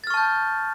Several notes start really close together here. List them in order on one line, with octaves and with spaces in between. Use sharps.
A6 F6 C#6 A5 G6